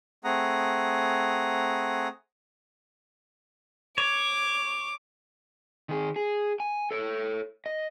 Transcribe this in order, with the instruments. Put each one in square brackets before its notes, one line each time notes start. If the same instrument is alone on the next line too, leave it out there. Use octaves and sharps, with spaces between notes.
[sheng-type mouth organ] A3 C4 G#4 F#5 A#5 D#6
[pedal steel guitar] C#5 [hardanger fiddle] D6
[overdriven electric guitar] D#3 G#4
G#4
G#5
A4 C#5
D#5